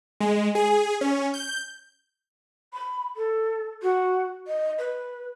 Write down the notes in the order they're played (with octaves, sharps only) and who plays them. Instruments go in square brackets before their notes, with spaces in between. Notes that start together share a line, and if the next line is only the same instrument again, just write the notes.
[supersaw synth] G#3
G#4
C#4
G6
[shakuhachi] B5
A4
F#4
D#5
B4